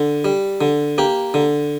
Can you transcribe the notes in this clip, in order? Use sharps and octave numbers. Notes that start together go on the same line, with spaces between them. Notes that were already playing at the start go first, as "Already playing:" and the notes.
Already playing: D3
G3
D3
A#3 G4
D3